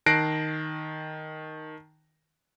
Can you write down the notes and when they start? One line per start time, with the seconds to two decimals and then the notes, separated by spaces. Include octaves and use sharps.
0.06 D#3 A5 F#6 A#6 C7 D7